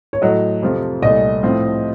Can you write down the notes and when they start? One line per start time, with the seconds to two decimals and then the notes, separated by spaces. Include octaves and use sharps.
0.13 C#5
0.22 A2 F#3 A3 D#5
0.62 F2 C3 F3 A3
1.02 C2 A#2 A3 D#5
1.43 A2 F3 A3 C4